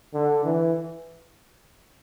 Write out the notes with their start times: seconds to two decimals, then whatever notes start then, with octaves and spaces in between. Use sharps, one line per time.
0.14 D3
0.45 E3